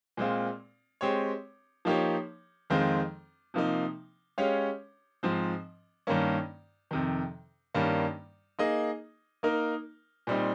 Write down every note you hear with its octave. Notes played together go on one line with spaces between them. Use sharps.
A#2 G#3 C4 F4
G#3 C4 G4 C#5
F3 A#3 D#4 G4 C#5
F2 D#3 G#3 C4 F4
C3 F3 A#3 D#4
G#3 C#4 G4 C#5 F5
G#2 F3 C4
G2 D#3 A#3 C#4
F2 C3 D#3
G2 D#3 G3 A#3 C#4
A#3 D#4 G#4 D#5
A#3 D#4 A#4
A#2 G3 C4 D#4